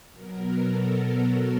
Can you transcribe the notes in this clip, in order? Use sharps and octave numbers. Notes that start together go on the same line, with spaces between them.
B2 F#3 B3 A#4
A4